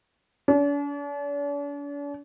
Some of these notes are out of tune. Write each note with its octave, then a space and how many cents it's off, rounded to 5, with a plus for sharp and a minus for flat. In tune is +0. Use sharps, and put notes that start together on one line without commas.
D4 -45